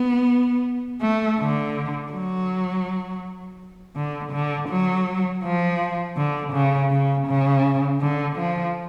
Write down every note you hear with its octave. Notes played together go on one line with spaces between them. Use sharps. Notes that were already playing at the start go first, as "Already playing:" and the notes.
Already playing: B3
A3
D3
F#3
D3
D3
F#3
F3
D3
C#3
C#3
C#3
D3
F3